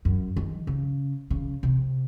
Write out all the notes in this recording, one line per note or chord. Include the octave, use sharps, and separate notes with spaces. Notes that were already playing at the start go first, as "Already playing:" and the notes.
F#2
D#3
C#3
C#3
C3